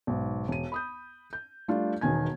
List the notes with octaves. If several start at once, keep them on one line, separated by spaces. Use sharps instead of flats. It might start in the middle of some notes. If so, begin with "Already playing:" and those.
B1 G#2
E1 D#7
B5 D#6 G6
G6
G3 A3 D4 F4
E1 B2 D#3 G#5 G#6